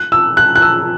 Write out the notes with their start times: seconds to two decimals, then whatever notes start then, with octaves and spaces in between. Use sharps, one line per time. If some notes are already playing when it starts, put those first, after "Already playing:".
Already playing: F#6
0.12 E6
0.37 F#6
0.55 F#6
0.62 E6